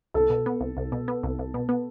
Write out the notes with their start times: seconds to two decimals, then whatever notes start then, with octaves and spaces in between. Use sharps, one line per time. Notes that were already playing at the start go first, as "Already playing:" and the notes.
0.14 C2 A4
0.30 B2
0.46 B3
0.61 C2
0.77 C2
0.92 B2
1.08 B3
1.23 C2
1.39 C2
1.54 B2
1.69 B3